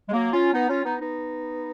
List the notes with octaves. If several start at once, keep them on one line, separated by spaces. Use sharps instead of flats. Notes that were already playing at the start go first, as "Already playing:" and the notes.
G#3
F#3 A#3
C#4 F4
B3 D#4
C#4 F4
B3 D#4
B3 D#4